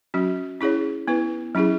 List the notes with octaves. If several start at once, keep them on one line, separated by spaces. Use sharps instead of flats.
F#3 C#4 F#4
C#4 E4 G#4 C#5
B3 E4 B4
F#3 C#4 E4 G#4